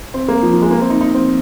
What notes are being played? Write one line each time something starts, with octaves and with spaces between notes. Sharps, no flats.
C4
A#3
F3
F3
G#3
A#3
C4
D#4
D#4
C4